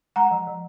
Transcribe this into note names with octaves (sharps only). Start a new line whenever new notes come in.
G#3 F#5 A#5
F3
F3